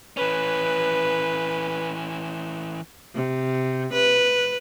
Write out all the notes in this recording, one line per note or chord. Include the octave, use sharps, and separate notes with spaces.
E3 C#4 B4
C3
B4